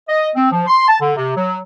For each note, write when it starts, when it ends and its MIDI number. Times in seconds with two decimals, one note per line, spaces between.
0.09 0.29 75
0.36 0.51 60
0.51 0.64 53
0.67 0.86 84
0.88 1.00 81
1.01 1.13 50
1.16 1.35 48
1.37 1.58 54